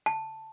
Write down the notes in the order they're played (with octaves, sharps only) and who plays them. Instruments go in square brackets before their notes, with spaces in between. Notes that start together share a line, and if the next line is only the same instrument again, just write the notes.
[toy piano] A5